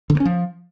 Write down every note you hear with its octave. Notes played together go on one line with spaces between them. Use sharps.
D3
A#3
C#4
F3